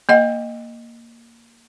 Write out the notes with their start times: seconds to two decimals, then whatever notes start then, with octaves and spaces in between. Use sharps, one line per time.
0.09 A#3 D#5 F#5